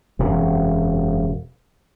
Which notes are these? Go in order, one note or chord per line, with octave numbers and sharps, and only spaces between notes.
E1 F#2 C3